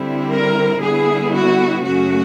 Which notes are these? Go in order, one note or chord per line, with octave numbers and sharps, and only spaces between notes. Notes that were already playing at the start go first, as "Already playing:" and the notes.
Already playing: D3 G3 C4 E4
A#4
D3 G3 B3 E4 G#4
F#4
F#2 C#3 F#3 A3 C#4 F#4